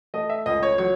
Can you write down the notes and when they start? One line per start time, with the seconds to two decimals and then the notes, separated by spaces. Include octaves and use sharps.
0.14 A3 D#5
0.30 E5
0.46 C#2 D#5
0.63 C#5
0.78 F#3 C#5